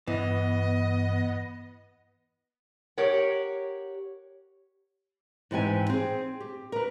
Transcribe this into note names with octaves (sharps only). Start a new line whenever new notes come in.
G2 E3 B3 D#5
G4 A#4 C#5 F#5
G#2 E3 C4 G4 G#5
C4 G#4
G4
A#4 B4